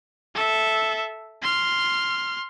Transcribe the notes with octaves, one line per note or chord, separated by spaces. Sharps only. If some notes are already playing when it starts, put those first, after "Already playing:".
A4 E5
C6 F6